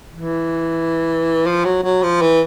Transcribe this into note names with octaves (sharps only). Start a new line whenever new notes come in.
E3
F3
F#3
F#3
F3
E3